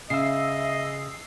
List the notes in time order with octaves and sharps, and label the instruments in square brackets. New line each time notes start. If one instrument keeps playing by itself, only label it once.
[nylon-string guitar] C#3 [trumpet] D#5 [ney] E5 [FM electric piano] E6 C7